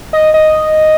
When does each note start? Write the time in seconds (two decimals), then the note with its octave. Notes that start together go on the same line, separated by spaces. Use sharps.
0.13 D#5
0.34 D#5